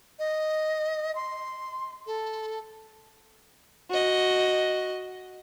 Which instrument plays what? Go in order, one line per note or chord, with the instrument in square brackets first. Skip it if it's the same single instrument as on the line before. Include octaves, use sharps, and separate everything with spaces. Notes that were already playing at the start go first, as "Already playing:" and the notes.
[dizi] D#5
C6
A4
[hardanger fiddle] F#4 D#5